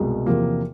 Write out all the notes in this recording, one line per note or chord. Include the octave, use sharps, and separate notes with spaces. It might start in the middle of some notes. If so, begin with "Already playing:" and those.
Already playing: C2 B2 G#3
E2 C3 F3 A#3